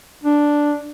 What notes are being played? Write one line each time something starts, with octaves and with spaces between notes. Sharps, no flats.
D4